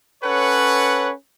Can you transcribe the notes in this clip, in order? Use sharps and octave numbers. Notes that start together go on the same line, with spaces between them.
C#4 A4 B4 C#5 F#5